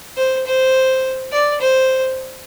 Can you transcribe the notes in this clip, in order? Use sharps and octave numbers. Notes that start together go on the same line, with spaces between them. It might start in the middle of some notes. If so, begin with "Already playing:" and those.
C5
C5
D5
C5